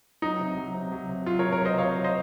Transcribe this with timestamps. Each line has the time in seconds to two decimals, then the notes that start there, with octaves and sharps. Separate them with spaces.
0.22 F#3 D#4
0.40 C3
0.57 F#3
0.74 C3
0.92 F#3
1.09 C3
1.26 F#3 F4
1.39 A#4 C#5
1.44 C3
1.52 A#4 C#5
1.61 F#3 C5 D#5
1.78 C3 C#5 F5
1.95 F#3
2.04 C5 D#5